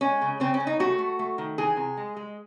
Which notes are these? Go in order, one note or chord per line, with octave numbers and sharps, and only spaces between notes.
G#3 C#4
C#3
C#3 C4
C#4
C#3
D#4
A3 F#4
A3
A3
D#3
E3 G#4
C3
G#3
G#3